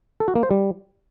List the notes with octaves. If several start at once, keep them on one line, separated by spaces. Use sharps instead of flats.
A4
F#4
A#3
C5
G3